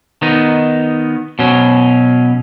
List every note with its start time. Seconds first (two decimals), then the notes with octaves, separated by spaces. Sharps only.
0.22 D#3 B3 D#4
1.39 B2 F#3 C#4